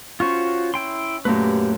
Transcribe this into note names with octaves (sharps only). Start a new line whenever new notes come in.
C#4 F4 F#4 C5 C#6
E4 G5 C6
F#2 A#2 A3 G4 B4